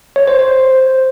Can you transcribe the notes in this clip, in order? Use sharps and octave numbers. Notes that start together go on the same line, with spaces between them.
C#5
C5
C5